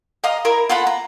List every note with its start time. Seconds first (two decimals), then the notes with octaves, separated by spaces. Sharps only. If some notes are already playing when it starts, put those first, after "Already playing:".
0.24 D#5 F5 A#5 D#6
0.45 E4 A#4 A#5
0.69 F4 A4 F#5 B5
0.87 A#5